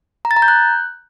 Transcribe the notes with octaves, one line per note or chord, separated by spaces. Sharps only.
A#5
A6
A#5
G6
F#6